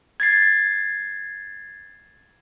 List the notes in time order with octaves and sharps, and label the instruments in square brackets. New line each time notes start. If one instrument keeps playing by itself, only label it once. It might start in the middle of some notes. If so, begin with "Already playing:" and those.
[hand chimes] G#6 A6 C7